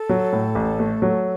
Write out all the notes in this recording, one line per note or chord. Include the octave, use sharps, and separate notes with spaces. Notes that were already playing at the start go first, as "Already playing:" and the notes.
Already playing: A4
F#3
A2
A1
A3
F#3